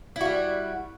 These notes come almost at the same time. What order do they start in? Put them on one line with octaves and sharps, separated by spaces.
E4 F#4 G3